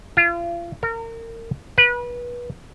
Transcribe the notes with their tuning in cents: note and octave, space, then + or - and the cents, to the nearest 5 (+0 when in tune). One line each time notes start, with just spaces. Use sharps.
F4 -35
A#4 -30
B4 -25